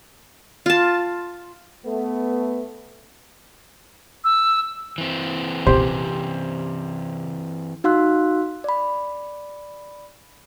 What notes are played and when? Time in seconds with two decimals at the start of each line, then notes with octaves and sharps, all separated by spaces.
0.66 F4 A5
1.86 A3 B3
4.24 E6
4.98 E3 C4
5.67 C3 C#4 G4 C5
7.84 D#4 F#4 F5 C6 E6 F#6
8.64 D5 B5